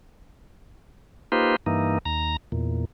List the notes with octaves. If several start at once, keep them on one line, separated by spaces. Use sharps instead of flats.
A#3 D#4 F4 G4 B4 C5
G2 E3 A#3 D#4
D#2 A#5
E2 A#2